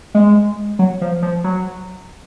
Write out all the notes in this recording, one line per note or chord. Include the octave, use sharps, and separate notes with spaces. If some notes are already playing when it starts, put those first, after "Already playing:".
G#3
F#3
F3
F3
F#3